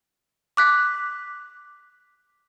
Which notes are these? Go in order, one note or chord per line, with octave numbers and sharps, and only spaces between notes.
D6 F#6 B6